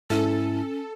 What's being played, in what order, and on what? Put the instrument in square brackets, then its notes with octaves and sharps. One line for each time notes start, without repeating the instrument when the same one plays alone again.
[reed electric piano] G#2 E4 [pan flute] C#4 [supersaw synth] A4